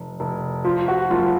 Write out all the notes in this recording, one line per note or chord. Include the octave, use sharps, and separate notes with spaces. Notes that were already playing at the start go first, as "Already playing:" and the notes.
Already playing: F1
F1
F3 F4
F#4
F#1 F4